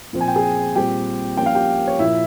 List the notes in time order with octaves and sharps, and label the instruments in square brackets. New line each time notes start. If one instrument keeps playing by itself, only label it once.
[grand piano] A#2 F3 C4
G#5
G5
G#4 G#5
A#2 G3 C4 G4 G5
F3 A#3 C#4 G5
F5
G4 G5
C#5
A#2 F3 A#3 E4 E5